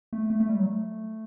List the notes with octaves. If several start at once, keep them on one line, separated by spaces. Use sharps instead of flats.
A3
A3
A3
G3
F#3
A3